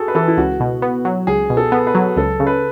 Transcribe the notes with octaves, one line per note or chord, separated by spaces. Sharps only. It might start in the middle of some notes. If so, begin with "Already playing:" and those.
Already playing: F#4 G#4 A4
B4
E3 A4
E4
C#2 F#4
B2
B3
F#3
C#2 G#4
B2
A4
B3
B4
F#3
C#2 A4
C#3
B4